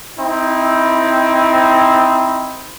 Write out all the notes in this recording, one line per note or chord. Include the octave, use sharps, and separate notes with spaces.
C4 D#4 E4